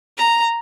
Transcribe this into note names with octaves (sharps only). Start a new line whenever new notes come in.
A#5